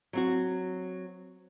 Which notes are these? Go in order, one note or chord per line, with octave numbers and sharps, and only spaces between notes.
F#3 C4 F#4